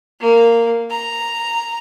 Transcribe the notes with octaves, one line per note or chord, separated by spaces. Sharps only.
A#3
A#5